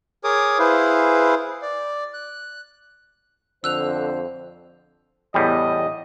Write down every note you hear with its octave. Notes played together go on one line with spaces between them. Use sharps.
G#4 A#4 C#5 D6 D#6
E4 G#4 B4 C5 F5
D5
F#6
F2 D3 C5 E6 F#6 F7
E2 A2 G3 D#5